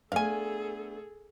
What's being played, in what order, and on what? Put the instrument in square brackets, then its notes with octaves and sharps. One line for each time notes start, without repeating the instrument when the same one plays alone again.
[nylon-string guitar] A3 B3 D4 [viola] G#4 A4 [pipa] F5 G#5